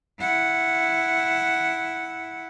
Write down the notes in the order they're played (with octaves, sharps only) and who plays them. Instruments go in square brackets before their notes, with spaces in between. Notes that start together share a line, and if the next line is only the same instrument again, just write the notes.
[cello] E4 F#5